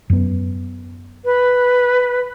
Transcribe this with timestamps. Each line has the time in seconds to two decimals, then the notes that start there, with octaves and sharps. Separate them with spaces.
0.10 F#2 B3
1.25 B4